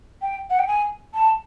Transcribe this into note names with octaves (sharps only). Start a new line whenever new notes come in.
G5
F#5
G5
G#5
A5